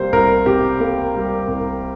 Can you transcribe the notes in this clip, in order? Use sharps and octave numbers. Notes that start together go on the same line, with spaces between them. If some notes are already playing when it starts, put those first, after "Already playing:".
Already playing: C3 G3 A#3 C5
C2 A#4
C3 G4
A#3
G3
C2